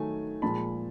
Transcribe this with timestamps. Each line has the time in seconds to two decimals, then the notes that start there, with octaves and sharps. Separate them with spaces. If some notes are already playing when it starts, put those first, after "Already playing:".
Already playing: D#3 F#3 A3 G#5
0.42 A#2 F3 G#3 A5 B5